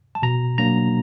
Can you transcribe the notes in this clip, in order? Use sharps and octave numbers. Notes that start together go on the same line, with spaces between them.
A5
B2 A#5
F#3 A#3 D4 A#5